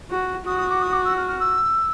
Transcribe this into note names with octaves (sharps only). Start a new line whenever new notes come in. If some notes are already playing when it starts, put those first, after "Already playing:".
F#4
F#4 D#6
D#6
D6
D#6
D6
E6
F6
F6
E6